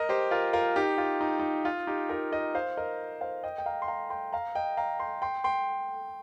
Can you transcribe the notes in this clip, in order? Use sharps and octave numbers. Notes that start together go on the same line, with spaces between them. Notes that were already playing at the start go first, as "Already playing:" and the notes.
Already playing: A#4 D#5
G4 C5
F4 A#4
F4 A#4
D#4 G4
F4
D#4
D#4
F4
D#4 G4
F4 A#4
A#4 D#5
C5 F5
A#4 D#5
C5 F5
D#5 G5
G5
F5 A#5
C6
F5 A#5
G5 C6
F5 A#5
D#5 G5
F5 A#5
G5 C6
G5 C6
G5 C6